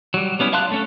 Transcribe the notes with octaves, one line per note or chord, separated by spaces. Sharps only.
F#3 G3
G3 B3 C#4 E4
E5 F5 A5 C6 F#6
A3 C#4 A4